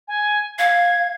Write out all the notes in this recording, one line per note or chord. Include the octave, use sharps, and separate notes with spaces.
G#5
F5 G#6